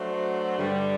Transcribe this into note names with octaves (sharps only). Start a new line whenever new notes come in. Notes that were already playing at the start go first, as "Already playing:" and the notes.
Already playing: F#3 A3 D4 F#4 C5
G2 D3 G3